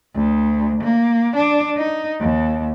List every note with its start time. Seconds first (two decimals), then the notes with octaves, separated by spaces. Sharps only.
0.15 D2
0.83 A#3
1.36 D4
1.77 D#4
2.20 D#2